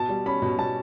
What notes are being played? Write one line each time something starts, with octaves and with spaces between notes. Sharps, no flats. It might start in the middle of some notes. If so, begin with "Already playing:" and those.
Already playing: B2 A5
G3
C#4 B5
B2
B2 A5